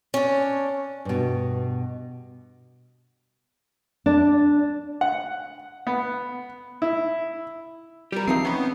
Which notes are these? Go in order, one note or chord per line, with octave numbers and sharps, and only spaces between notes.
C#4 D4
G2 B2
D4
F#5
B3
E4
G3 G4 A#4
E3 F3 C4 D#4 C7
B3 C#4 B5